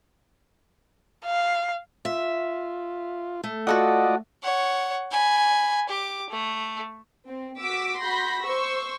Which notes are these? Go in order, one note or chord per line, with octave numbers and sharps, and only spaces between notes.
F5
F4 E5
A3
F4 F#4 A4 D5 D#5 F#5
C#5 F#5
G#5 B5
G4 D6
A3
C4
F#4 D6 E6 B6 D7
F#4 B5 C6 G6 A#6
C5 C#6 E6